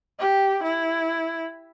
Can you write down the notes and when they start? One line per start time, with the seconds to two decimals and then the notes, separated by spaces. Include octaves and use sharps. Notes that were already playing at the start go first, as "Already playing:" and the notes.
0.20 G4
0.63 E4